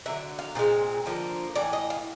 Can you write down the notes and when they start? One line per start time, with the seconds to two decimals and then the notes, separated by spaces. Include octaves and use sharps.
0.06 D3 F#3 B3 E5
0.39 F5
0.55 A#2 F3
0.59 G#3 C4
1.06 D3 F3 A#3
1.56 A2 E3 D5
1.73 D#5
1.90 F5